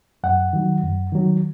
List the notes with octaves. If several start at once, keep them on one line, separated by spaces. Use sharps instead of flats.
F#2 F#5
D#3 F#3
F#2
D#3 F#3